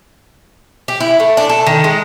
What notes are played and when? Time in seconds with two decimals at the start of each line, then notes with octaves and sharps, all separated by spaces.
0.88 G4
1.00 E4
1.20 A3
1.37 D4
1.49 A4
1.67 D#3
1.84 G#3